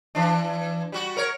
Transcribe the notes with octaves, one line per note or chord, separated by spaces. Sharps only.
E3 D4
G3 F#4
A#4 C#5